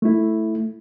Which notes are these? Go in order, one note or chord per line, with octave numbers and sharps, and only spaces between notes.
A3 E4